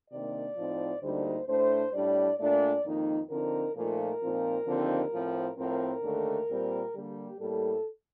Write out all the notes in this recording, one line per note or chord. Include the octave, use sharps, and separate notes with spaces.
C3 D#3 A#3 D4 D5
A2 F3 C4 D#4
D2 D3 G3 A#3 D#4 C5
A2 A3 D4 C5
A2 G3 D4 D5
A#2 A3 D4 D5
F2 D#3 A#3 D#4
D3 F3 C4 D#4 A#4
A#2 F3 A3 D#4 A#4
A#2 F3 C4 D#4
D#2 D3 F3 C4 D#4
A2 F3 C4
A2 F3 C4 A#4
D#2 D3 A3
A#2 G3 C4
D3 G3 A#3 G4
A2 G3 A#3 A4